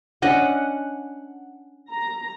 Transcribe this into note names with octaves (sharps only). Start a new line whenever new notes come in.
C#4 D4 D#5 F#5
A#5